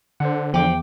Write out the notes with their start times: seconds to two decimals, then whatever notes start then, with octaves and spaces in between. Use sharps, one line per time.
0.20 D3 C5 F#5
0.54 E2 F3 G5 D6